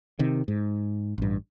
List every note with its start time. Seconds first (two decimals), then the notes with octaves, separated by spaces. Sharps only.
0.19 C3 D#3
0.48 G#2
1.18 A1 G2